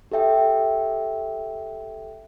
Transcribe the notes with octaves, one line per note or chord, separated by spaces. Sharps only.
G4 A4 E5 G5